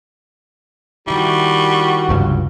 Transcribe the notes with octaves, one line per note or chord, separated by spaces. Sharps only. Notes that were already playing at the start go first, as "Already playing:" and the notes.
D#3 G3 E4 F#4
F1 C#2 G2